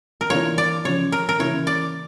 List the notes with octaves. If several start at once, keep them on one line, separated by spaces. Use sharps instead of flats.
A#4
E3 A#3 D4 F4 C#5
D5
C#3 F3 C#4 F4 C#5
A#4
A#4
C#3 E3 A#3 E4 C#5
D5